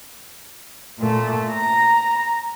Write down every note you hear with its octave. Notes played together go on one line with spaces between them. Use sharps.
A#2 A3
A#5